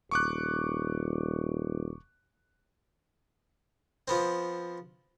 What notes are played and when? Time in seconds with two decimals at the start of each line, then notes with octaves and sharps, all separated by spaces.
0.11 D#1 C#6 D6 F#6
4.08 F3 B3 C4